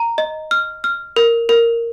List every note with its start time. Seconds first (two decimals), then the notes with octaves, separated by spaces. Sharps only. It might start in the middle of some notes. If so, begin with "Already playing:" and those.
Already playing: A#5
0.18 D#5
0.51 F6
0.84 F6
1.16 A#4
1.49 A#4